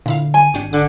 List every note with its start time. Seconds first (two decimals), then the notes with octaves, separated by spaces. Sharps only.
0.06 A#2 D3 E4 F5
0.34 G#5
0.54 G#1 D4 G4 C#6
0.73 D3 D6 F#6 G#6